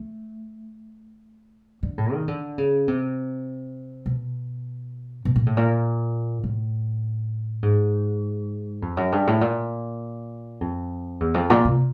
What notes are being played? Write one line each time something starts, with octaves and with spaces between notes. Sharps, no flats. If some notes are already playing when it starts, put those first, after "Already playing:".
Already playing: A3
D3
A2
D#3
D3
C#3
C3
B2
B2
A#2
A2
A#2
A2
G#2
F2
F#2
G2
A2
A#2
F2
E2
F2
A#2
C3